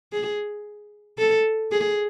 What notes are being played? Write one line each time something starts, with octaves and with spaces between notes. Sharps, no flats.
G#4
A4
G#4